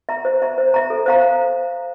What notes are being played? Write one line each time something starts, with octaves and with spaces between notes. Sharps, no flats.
E5 A#5
C5
E5 A#5
C5
E5 A#5
A4
C5 F5 A#5